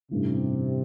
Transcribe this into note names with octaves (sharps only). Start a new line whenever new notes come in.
A1 G2 C3 E3